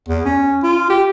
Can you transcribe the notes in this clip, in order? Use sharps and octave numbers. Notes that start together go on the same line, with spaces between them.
E2
C#4
F4
G4